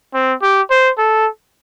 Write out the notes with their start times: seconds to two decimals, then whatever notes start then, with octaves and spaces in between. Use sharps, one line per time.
0.14 C4
0.42 G4
0.70 C5
0.98 A4